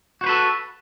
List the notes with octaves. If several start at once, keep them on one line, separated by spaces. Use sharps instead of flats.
F#4 A4 B4 C5